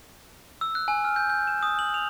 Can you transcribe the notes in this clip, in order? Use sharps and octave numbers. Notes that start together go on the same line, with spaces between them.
E6
F#6
G#5
F6
G6
G6
E7
D#6
F#7
F7